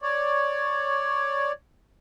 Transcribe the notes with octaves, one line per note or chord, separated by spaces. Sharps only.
C#5 D5